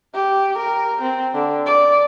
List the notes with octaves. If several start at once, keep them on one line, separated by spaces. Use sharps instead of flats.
G4
A#4
C4
D3
D5